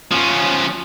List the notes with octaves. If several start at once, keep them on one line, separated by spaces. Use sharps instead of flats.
F3 C#4